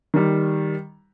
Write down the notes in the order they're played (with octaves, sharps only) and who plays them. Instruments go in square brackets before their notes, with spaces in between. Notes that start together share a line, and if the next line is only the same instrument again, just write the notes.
[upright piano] D#3 G3